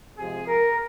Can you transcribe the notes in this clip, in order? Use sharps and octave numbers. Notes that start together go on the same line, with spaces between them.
C3 F3 G#3 G#4
A#4